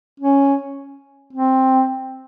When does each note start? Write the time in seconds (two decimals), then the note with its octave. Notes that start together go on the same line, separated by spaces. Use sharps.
0.20 C#4
1.33 C4